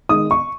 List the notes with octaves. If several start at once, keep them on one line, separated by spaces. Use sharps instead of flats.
D#3 G#3 D#6
C#6